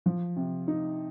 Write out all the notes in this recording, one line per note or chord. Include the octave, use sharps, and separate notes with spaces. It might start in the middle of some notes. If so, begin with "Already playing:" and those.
F3
C3
D#4